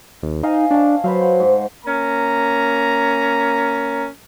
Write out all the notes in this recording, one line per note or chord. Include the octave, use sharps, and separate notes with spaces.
D#2
D#4 D#5 F5 G#5
D4 C#5 A5
F#3 B4 C5 F5
C5 F#5
G#2
A#3 C#4 A#5